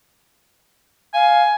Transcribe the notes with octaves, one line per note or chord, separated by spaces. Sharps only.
F5 G#5